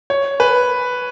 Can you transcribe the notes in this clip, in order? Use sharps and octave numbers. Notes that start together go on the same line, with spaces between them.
C#5
B4